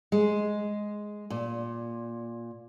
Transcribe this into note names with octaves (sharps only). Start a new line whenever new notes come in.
G#3
A#2